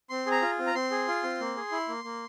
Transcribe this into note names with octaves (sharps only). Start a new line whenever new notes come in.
C4 C6
G#4
A#5
F4
C4
A#5
C4 C6
G#4
F4
C4
A#3
G#4
E4
A#3
A#3